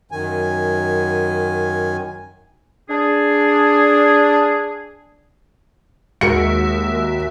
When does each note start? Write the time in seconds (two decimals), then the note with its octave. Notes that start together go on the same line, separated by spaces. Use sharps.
0.11 F#2 D#3 G#5
2.88 D4 G#4
6.21 D#2 G#3 F#4 A#4 E5 C#7